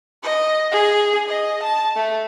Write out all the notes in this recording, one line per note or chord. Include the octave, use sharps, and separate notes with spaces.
D#5
G#4
D#5
A5
A3